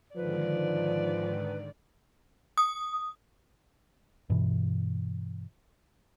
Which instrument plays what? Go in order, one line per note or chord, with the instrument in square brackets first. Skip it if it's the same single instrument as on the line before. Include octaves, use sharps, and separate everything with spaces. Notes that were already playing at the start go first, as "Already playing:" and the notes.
[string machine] G#2 D3 D#3 [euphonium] F3 [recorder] B4 [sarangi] D5
[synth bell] D#6
[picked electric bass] G2 B2 E3